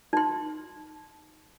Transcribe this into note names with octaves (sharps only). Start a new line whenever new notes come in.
D#4 C6